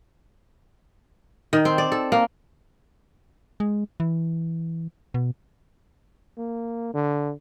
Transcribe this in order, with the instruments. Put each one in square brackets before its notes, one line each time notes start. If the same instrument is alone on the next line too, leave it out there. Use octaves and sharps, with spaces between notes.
[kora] D#3
C4
D5
A4
A#3
[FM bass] G#3
E3
B2
[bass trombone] A#3
D3